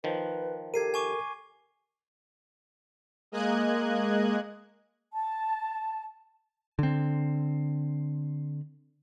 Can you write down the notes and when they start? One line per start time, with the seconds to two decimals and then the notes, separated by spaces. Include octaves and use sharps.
0.04 D#3 F3 B4
0.74 G4 A4 A#4 G#6 C7 D#7
0.94 G#5 C#6 D6
3.32 G#3 A#3 D#5 F#6 G#6
5.12 A5
6.79 D3 C4